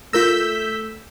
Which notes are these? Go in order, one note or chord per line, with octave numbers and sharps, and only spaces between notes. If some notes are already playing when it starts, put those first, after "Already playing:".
A3 F4 A#4 E6 G6 A#6 B6